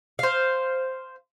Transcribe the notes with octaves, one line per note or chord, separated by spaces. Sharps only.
C5 F5